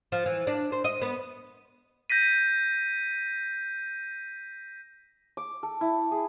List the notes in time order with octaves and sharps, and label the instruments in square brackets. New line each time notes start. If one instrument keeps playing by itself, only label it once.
[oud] F3
E3
D4
C5
D#5
B3
[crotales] G6 A#6 B6 D#7
[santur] D6
A4
E4
G#4